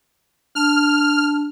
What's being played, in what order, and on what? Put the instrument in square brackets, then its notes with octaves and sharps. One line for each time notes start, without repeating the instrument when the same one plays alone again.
[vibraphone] D4 A5 [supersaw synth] F6